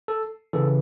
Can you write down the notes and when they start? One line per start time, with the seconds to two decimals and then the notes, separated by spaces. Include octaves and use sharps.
0.08 A4
0.53 C#3 E3 A4